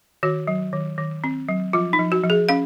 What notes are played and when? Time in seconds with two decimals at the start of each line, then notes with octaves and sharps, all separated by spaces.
0.23 D#3 F#4
0.48 F#3
0.73 D#3
0.98 D#3
1.24 C4
1.49 F#3
1.73 F3 F4
1.93 D#4
1.99 F3
2.12 F#4
2.24 F3
2.30 G#4
2.49 C#4 F5